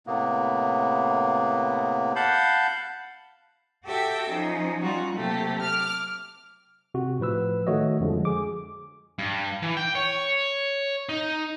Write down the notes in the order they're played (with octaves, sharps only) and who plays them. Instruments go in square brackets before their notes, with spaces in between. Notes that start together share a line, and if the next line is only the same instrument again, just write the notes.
[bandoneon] A2 C3 A#3 B3
F5 F#5 A5 B5 G6
[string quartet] F#4 G4 A4 E5 G5
F3 C#4 D#4
G3 C#4 D#4 F4 F#4
C3 F#3 A3 A#3 G4
D6 F6
[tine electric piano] C3 F#4
A2 F3 B4 E6
D#3 A3 F#4 C#5 D#5
F2 D3 F3 G#3
G#4 D6
[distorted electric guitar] G2
E3
G5
C#5
D#4